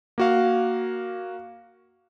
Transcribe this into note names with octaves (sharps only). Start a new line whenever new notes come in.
A#3 F#4 F5